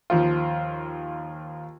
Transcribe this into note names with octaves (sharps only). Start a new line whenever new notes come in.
D#2 F3 F4